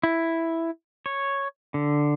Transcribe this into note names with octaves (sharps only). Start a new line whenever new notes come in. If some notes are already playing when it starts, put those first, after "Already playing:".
E4
C#5
D3